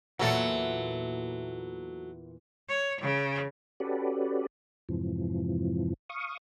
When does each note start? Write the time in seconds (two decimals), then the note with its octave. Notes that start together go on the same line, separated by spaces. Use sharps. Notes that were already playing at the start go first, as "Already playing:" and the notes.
0.19 E2 A#2 E3 F#3 A4 E5 F#5
2.69 C#5
3.01 C#3
3.80 C#4 F#4 G4 A4 B4 D5
4.89 F2 G#2 C3 E3 F3
6.10 F5 C#6 D#6